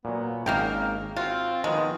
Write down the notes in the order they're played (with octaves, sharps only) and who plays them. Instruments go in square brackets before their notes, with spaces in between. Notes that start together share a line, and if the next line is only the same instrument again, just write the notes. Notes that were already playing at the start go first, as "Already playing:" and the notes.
[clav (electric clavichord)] A#2 F#3 [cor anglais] B3
[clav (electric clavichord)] G#1 C#4 D#5 [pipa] A#3 F5 G5 [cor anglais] A#4
[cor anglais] C4 [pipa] F4 [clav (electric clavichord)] F#4
[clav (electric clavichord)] D#3 F3 B3 [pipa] G#3 [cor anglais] D#5